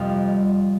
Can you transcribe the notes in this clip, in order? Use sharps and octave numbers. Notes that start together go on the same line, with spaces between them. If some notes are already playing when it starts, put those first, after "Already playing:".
Already playing: F2 C3 G3 D#5 F5